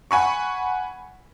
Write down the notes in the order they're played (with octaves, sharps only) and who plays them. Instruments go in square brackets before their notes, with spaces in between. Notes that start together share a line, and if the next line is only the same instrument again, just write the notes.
[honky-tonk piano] F#5 G#5 B5 C#6